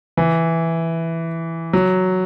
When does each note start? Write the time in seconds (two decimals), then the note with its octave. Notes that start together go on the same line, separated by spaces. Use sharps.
0.17 E3
1.73 F#3